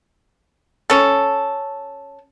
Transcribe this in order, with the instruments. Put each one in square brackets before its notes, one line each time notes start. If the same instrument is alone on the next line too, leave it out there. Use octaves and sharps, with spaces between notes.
[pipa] C#4 A4